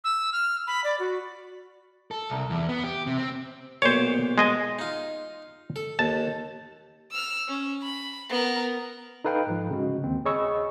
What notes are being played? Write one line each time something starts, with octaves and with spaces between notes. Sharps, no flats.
E6
F6
B5
D5
F#4
A4
C2
E2
B3
G4
C3
C4
B1 A#2 C5 C#5 D6
G#3 D#5 G#5
D#4 F4
A4
D#2 A5
E6 F6
C#4
B5
B3 A#4
D#4 A4 B4 F5 G5
G#2 F3
C#3 G#3 F#4
D#2 C4
G#4 C#5 D#5 B5 C#6 E6